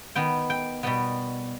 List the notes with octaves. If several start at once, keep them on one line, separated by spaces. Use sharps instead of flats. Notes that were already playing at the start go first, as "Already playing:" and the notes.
D#3 B3 G5
G5
B2 G3 B3 G5